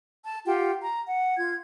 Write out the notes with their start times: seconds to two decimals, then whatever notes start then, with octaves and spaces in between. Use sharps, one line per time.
0.22 A5
0.46 F4 G4 F#5 G5
0.82 A#5
1.07 F#5
1.36 F4 G#6